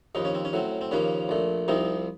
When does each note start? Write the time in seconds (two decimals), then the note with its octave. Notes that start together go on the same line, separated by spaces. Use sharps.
0.15 D#2 C#3 F3 D#4
0.25 C#4
0.35 C4
0.45 C#4
0.53 A2 F#3 C4
0.81 C4
0.91 D#2 C#3 F3 A#3 C#4
1.29 A#1 A#2 A3
1.68 C2 C3 F3 C4 D#4